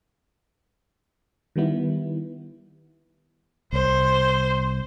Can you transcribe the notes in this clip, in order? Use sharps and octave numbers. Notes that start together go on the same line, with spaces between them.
D#3 G3 B3 E4
C2 C5